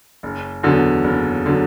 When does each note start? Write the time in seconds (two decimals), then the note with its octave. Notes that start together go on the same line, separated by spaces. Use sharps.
0.23 F#1
0.63 E2 D3 F#3
1.04 F#1
1.46 D3 F#3